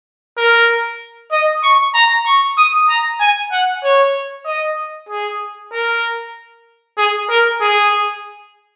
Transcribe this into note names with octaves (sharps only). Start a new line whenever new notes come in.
A#4
D#5
C#6
A#5
C#6
D#6
A#5
G#5
F#5
C#5
D#5
G#4
A#4
G#4
A#4
G#4